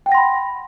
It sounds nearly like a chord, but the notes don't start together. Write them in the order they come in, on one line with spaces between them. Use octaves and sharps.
G5 F#5 A#6 C6 B5